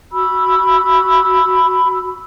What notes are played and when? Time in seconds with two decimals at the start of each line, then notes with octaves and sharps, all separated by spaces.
0.12 F#4 B5 E6